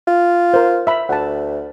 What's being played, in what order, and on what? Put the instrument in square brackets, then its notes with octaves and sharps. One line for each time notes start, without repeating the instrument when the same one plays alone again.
[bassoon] F4
[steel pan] A#4 C5
E5 B5 E6
[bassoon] D2 [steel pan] F#5 A5